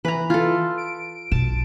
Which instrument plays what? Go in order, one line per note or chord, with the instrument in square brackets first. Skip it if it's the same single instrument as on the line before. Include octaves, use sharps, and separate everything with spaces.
[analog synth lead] E3 [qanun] B4 A#5
[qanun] F4 A4
[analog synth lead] D7
[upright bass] B1 [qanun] A5